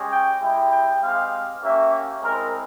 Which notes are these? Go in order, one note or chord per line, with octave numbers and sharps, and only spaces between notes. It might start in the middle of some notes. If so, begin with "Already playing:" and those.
Already playing: G#3 C#4 G4
G5
G#3 E4 G4 G5
G5
G#3 C4 G4 F5
A#3 C#4 G4 E5
G#3 C4 E4 A#4